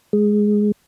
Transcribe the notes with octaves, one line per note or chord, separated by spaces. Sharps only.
G#3